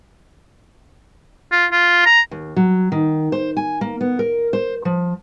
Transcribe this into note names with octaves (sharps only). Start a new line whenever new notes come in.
F4
F4
A#5
D#2
F#3
D#3
C5
G#5
A#3
B3
A#4
C5
F3